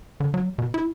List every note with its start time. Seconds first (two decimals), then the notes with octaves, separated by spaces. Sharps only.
0.20 D3
0.34 F#3
0.58 B2
0.74 E4